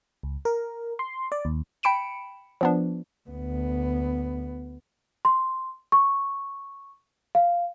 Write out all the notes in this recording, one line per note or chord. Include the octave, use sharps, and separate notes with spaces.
C#2
A#4
C6
D5
D#2
G5 B5 C#7 D7 E7
F3 B3 D4
D2 B3
C6
C#6
F5